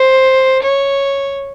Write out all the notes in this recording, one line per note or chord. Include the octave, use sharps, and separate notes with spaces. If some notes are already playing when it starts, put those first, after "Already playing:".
Already playing: C5
C#5